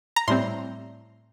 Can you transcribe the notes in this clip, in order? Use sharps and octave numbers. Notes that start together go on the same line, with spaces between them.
A#5
A2 G3 C4 C6